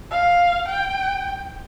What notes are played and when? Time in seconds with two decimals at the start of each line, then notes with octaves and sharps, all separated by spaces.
0.11 F5
0.68 G5